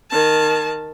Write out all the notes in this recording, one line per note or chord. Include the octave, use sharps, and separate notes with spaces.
D#3 A5